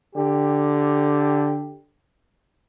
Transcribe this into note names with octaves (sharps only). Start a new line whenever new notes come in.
D3 G4